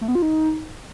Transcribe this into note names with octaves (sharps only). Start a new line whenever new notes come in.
A3
B3
F4
D#4